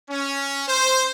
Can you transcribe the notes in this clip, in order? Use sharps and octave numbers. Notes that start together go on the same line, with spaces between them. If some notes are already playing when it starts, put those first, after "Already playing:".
C#4
C5